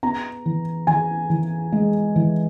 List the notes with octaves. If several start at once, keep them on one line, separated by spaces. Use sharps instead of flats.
B3 A#5
E3
E3 G#5
E3
G#3
E3